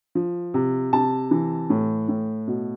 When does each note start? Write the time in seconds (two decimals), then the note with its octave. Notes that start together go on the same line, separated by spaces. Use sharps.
0.15 F3
0.54 C3
0.93 C3 A5
1.31 E3
1.70 A2
2.09 A2
2.47 B2